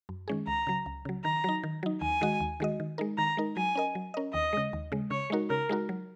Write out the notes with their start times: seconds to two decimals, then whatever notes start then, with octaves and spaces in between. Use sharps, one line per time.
0.09 F#2
0.28 D#3 G#3 C#4 G#4
0.47 C#2 A#5
0.67 C#3 F#3
0.86 C#2
1.05 C#3 F#3
1.24 D#3 A#5
1.44 F#3 D#4
1.64 D#3
1.83 F#3 D#4
2.01 D#2 G#5
2.21 D#3 G#3 F#4 D#5
2.40 D#2
2.60 D#3 G#3 F#4 D#5
2.80 D#3
2.98 G#3 D#4 A#4
3.17 D#3 A#5
3.37 G#3 D#4 A#4
3.57 F#3 G#5
3.75 C#4 A#4 D#5
3.95 F#3
4.14 C#4 A#4 D#5
4.33 D#2 D#5
4.53 C#3 G#3
4.73 D#2
4.92 C#3 G#3
5.11 C#3 C#5
5.30 G#3 D#4 F#4 A#4
5.50 C#3 A#4
5.69 G#3 D#4 F#4 A#4
5.89 F#3